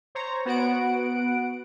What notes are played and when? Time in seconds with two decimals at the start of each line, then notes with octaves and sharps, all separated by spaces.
0.15 C5 C#5 A#5
0.45 B3 F#4 F#5 D7